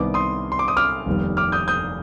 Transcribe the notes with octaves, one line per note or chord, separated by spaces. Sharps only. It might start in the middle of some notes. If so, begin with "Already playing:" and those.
Already playing: C2 C3 D#3 B3 D6
C6 D#6
C6
D6
D#6
D6 F6
F1 D#2 D#3 G3 B3
D6 F6
D#6 G6
D#6 G6